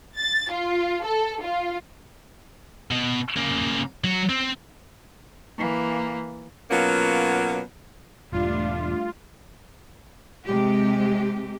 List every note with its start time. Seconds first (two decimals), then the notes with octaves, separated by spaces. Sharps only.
0.18 A6
0.51 F4
1.04 A4
1.41 F4
2.91 B2
3.36 C#3 A#3
4.04 F#3 F#4
4.29 C4
5.58 E3 A#3
6.71 B2 F#3 A#3 B3 C#4 F4
8.32 E1 E2 G#2 G3 A3 D4 F4
10.45 C3 G#3 G4